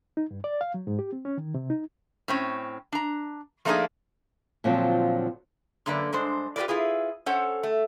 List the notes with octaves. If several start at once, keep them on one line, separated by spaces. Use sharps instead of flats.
D#4
G2
D5
F5
F#3
G#2
G4
C4
C#4
D#3
C3
D#4
A2 C4 C#4
D4 A#5
F3 A3 A#3 D4 D#4 G#4
A#2 D3 F3 F#3 C4 F4
F#2 D3 A#3 B4 D5
G2 G#3 D4 C5
F4 G4 G#4 A#4 B4 D5
E4 F4 G#4 B4
C#4 A4 C5 C#5 F#5
A3